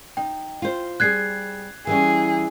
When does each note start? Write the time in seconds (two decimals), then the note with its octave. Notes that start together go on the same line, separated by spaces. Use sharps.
0.17 D#4 G5
0.62 F4 C5
1.00 G3 C4 G#4 F#6 G#6 C7
1.87 E3 G3 C#4 G#4